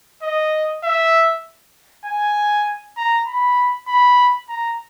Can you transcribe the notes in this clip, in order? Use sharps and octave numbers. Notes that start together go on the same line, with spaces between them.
D#5
E5
G#5
A#5
B5
B5
A#5